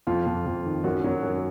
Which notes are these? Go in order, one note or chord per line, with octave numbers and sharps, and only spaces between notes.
F2 F4
F2
F2
D#3
F#2 F#4
F#3
F#2